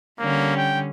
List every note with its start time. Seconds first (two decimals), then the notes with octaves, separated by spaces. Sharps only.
0.19 D3 G3 A#3 C#4
0.57 G5